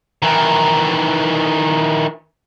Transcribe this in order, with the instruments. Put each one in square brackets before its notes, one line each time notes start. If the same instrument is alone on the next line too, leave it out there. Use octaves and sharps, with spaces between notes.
[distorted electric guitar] D#3 E3